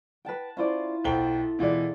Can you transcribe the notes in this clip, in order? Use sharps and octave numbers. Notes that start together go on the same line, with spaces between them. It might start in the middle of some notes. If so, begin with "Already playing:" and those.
B4 F#5 G5 A5
C#4 E4 F4 C5 D5
B1 A4 C5 G5 C6 G7
B2 E3 G#3 F4 D5